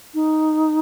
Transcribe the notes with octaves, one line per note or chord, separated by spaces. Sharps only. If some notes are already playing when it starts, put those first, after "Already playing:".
D#4